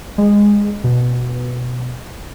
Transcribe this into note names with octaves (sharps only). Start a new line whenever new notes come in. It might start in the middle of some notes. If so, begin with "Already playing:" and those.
G#3
B2